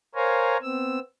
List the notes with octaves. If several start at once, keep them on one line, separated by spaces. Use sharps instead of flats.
A#4 C5 C#5 F5 G#5 A#5
B3 C4 E6